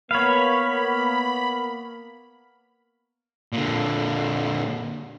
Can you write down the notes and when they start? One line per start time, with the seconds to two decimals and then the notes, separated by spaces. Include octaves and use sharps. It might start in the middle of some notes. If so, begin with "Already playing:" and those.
0.11 A#3 B3 C#5 F5 B5
3.52 A#2 D3